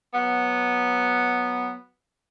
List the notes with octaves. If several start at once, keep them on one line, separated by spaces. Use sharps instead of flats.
F#3 B3